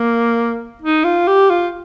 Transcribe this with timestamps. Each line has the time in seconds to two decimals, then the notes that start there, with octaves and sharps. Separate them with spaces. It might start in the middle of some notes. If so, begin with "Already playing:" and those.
Already playing: A#3
0.82 D#4
1.04 F4
1.27 G4
1.50 F4